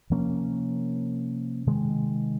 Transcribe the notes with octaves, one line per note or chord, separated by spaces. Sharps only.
C3 F3 A#3 C#4
C3 D#3 G#3